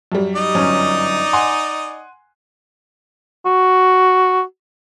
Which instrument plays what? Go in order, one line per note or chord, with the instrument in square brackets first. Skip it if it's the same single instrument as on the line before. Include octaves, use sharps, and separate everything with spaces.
[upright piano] F#2 G3
[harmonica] D#4 D5 D#5
[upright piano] G1 F#2 C#4
F#5 G#5 C6
[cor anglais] F#4